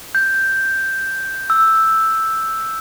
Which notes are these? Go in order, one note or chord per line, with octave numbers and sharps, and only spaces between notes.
G6
E6